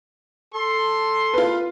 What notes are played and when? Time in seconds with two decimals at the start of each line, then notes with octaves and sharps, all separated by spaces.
0.54 A4 C6
1.34 F4 B4